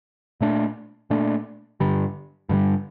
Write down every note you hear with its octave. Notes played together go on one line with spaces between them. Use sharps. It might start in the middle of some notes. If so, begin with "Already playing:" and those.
A#2 A3 D4
A#2 A3 D4
G2 D3 G3
G2 D3 G3